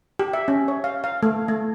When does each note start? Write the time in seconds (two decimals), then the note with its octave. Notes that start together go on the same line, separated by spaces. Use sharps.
0.19 G4
0.33 E5
0.48 C#4
0.68 C#5
0.84 F5
1.04 F5
1.23 A3
1.48 A3